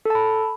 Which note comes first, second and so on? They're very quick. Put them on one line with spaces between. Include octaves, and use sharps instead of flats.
A4 A5 B5